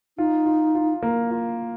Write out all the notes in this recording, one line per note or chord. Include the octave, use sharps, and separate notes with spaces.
D#4 F4
F4
F4
A#3
F4